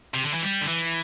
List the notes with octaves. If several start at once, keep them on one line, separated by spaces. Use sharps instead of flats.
C3
D3
E3
G3
D3
E3